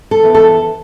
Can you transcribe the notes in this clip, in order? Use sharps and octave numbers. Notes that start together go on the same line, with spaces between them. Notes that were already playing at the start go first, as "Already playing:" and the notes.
A4
E3 B3
A4